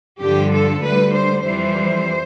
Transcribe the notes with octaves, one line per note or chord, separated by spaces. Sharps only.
G2 D3 F3 G4
A4
D2 D3 G3 B4
C5
F2 E3 G3 C5